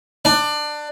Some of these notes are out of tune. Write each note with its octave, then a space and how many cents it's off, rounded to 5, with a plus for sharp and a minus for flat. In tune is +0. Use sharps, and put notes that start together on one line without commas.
D4 +20